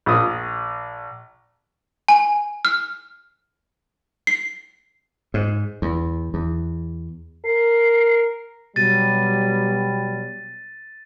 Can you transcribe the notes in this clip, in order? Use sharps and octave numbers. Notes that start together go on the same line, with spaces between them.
A#1 D#6
G#5
F6
C7
G#2
E2
E2
A#4 C7
B2 F#3 G3 A6 D#7